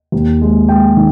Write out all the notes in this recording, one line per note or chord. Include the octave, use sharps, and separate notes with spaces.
D#2
G#3
G#3 G5
D#3